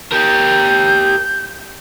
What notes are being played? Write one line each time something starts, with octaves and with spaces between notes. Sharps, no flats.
G4 A#4 G6